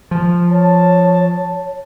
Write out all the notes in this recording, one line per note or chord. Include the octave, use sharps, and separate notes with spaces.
F3
C#5 A5